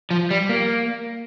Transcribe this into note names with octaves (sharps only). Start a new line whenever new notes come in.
F3
G3
A#3